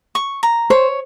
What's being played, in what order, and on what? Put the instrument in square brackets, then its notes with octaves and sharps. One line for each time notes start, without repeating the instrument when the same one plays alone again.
[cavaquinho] C#6
A#5
[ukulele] C5 [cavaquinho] C#5